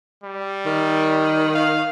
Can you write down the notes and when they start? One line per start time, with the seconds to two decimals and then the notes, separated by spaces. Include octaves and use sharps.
0.24 G3
0.66 D#3
1.55 F5